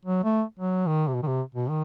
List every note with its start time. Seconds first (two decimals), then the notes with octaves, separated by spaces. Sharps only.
0.05 F#3
0.24 A3
0.60 F#3
0.87 D#3
1.08 C3
1.14 B2
1.23 D#3
1.27 C3
1.55 B2
1.69 D#3